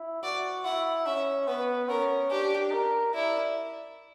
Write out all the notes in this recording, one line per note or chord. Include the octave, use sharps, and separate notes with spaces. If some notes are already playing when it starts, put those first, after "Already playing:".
Already playing: E4
F#4 D5
E4 F#5
C#4 E5
B3 B4
C#4 A#4
D4 G4
A#4
E4 D5